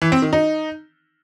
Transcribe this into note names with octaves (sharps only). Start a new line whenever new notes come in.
E3
C4
D#3
D#4